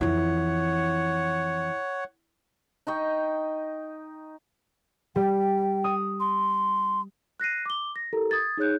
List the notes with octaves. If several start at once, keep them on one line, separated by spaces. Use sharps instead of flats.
F2 E3 E4 C#5 F#5
D#4 G5 C#6
G3 G5
D#6
C6
F#6 A#6 C7 D#7
D6 G7
A#6
E4 G4 A4 A#4 A#5
D#6 G#6 A6
D#4 G#4 C#5 F#6 G6